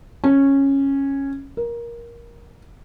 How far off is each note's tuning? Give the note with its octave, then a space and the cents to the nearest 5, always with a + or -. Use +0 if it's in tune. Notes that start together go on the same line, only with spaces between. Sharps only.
C#4 -10
A#4 +15